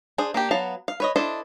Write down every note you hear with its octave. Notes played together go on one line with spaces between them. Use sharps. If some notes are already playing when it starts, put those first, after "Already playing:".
D4 G#4 C5
A#3 D4 G4
F#3 B3 F5 A5
F5
B4 C#5 D#5
D4 E4 A4 C5 D#5